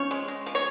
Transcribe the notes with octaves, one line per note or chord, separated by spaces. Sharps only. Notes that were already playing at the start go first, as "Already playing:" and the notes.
Already playing: F3 C#4 C#5
G#3
G#3
F3
C#5